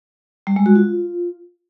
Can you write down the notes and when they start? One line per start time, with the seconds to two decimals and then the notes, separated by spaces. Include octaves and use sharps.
0.47 G3
0.56 G#3
0.66 F#4
0.75 F4